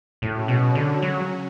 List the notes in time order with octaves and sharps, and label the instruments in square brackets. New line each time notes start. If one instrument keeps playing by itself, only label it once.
[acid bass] A2 [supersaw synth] C#3 F#3 C#4 F#4
[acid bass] B2
D3
F#3